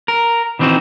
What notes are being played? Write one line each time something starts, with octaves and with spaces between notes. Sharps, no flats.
A#4
D#3 E3 C4 D#4 F#4